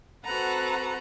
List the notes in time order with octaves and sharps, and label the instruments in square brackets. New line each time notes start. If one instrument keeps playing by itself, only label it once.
[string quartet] C4 F#4 A4 B4 F#5 A#5